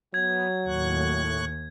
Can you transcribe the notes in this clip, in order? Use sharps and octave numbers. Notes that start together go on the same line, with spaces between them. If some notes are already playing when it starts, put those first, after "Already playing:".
F#3 B3 G#6
D#2 A2 C#6 F#6